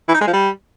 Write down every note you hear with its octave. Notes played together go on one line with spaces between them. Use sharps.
E3
D#4
G#3
F3
G3